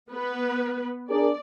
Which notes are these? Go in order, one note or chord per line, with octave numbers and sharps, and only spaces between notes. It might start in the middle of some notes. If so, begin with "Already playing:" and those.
B3 B4
D4 G#4 A#4 D5